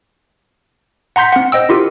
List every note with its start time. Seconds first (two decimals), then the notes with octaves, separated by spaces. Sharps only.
1.16 F#5 A#5 C6 G6 B6
1.32 C4 F#5
1.52 C5 D#5 G5 E6
1.69 E4 F4 G4 A#4